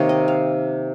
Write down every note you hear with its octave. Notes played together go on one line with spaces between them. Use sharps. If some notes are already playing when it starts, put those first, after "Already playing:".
Already playing: C3 D#3 A#3 D#4 C#5
D#5
F5